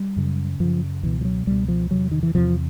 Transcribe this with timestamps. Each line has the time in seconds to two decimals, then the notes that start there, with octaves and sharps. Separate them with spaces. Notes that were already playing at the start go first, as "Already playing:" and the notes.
Already playing: G3
0.16 F#2 C#3
0.60 F#2 C#3 F3
1.03 C#2 B2 E3
1.21 F3
1.25 F#3
1.47 C#2 B2 G3
1.68 F3
1.91 E2 C3 F#3
2.11 D#3
2.23 E3
2.35 E2 C3 F3